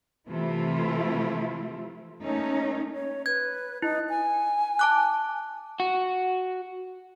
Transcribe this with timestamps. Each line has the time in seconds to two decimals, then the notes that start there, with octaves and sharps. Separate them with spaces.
0.29 C3 E3 F3 A3 E4 F4
2.21 A3 A#3 C#4 D#4
2.94 C#5
3.26 B4 G#6
3.82 D#4 E4
4.09 G#5
4.79 A5 D6 F#6
5.80 F#4